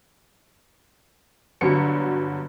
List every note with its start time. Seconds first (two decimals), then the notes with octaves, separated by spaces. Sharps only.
1.61 G1 G2 D3 F#3 C#7